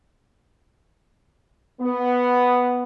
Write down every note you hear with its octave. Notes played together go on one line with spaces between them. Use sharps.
B3